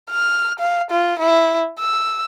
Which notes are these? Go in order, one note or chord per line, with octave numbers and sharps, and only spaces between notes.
F6
F5
F4
E4
E6